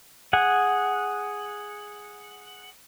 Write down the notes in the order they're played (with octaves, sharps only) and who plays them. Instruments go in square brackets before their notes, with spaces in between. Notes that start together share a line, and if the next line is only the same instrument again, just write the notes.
[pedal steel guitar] G#4 F#5